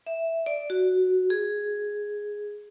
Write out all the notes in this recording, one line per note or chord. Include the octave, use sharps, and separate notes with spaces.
E5
D5
F#4
G#4